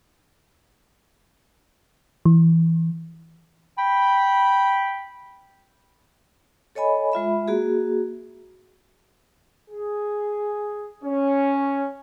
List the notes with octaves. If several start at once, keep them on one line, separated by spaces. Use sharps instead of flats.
E3
G5 B5
A4 C#5 D#5 G#5 B5
G#3 F4 E5 B5
A#3 F#4 G#4
G#4
C#4